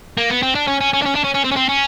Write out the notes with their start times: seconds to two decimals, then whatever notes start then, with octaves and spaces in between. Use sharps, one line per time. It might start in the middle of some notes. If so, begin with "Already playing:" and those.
0.18 A#3
0.30 B3
0.43 C4
0.55 D4
0.67 C#4
0.81 C#4
0.93 C#4
1.02 D4
1.06 C#4
1.15 D4
1.24 C#4
1.34 C#4
1.44 C4
1.51 C#4
1.56 C4
1.69 C#4